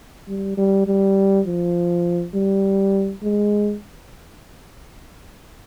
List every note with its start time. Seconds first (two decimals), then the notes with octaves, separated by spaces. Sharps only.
0.28 G3
0.57 G3
0.87 G3
1.46 F3
2.34 G3
3.23 G#3